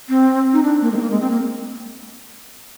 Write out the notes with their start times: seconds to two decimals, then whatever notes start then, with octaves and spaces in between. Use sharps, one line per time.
0.09 C4
0.53 D#4
0.63 D4
0.82 A#3
0.92 G#3
0.97 C4
1.01 A#3
1.11 G#3
1.21 C4
1.31 A#3